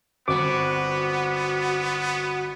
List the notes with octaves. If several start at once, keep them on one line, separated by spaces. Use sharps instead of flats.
G1 B3 C4 F#4 D6